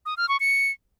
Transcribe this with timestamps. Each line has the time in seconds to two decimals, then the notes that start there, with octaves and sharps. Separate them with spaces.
0.06 D#6
0.17 F6
0.29 C#6
0.40 C#7